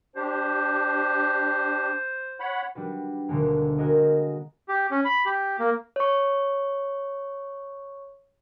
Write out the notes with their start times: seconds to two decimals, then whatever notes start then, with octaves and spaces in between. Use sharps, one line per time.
0.16 D4 G4 C5
2.40 C#5 F#5 B5
2.75 G3 D4 F#4 B4
3.29 D2 B2 D3 G#3 A#3
3.78 F#4 G#4 A#4 D#5
4.69 G4
4.91 C#4
5.05 B5
5.26 G4
5.59 A#3
5.96 C#5 C#6